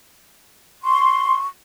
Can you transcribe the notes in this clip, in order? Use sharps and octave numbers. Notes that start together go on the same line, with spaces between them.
C6 C#6